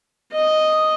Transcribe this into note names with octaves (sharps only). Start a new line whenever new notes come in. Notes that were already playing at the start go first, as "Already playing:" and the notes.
D#5